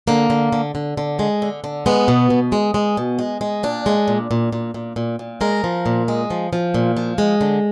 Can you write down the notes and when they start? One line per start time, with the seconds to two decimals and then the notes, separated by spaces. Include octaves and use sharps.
0.08 D3 A#3
0.30 D3
0.53 D3
0.75 D3
0.97 D3
1.19 G#3
1.42 D3
1.64 D3
1.86 G#3 B3
2.08 B2
2.30 B2
2.52 G#3
2.74 G#3
2.97 B2
3.19 G#3
3.41 G#3
3.63 A#2 D4
3.86 G#3
4.08 A#2
4.31 A#2
4.52 A#2
4.74 A#2
4.96 A#2
5.19 A#2
5.41 G#3 A#4
5.64 F3
5.86 A#2
6.08 G#3
6.30 F3
6.53 F3
6.74 A#2
6.97 F3
7.18 G#3
7.41 D3